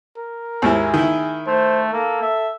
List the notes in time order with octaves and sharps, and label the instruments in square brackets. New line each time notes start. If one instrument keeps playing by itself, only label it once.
[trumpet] A#4
[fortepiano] D#2 G#2 E4 [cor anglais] G#4
[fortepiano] D#3 E4
[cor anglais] A3 [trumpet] C5
[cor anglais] A#3 [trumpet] A4
[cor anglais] E5